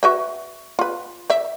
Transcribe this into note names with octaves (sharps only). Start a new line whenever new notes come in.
F#4 B4 E5
F4 B4
D5 E5